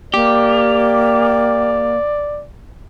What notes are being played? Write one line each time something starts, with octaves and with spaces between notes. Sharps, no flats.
A#3 G4 D5